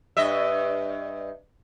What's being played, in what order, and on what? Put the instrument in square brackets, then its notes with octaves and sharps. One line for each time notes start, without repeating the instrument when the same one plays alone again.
[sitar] G2 D#5 E5